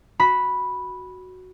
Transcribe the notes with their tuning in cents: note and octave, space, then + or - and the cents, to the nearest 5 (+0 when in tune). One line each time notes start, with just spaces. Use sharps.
F#4 +0 B5 -5